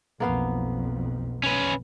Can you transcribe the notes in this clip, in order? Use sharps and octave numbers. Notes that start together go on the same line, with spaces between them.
B1 F2 A#3 B3 F5
C#4 B4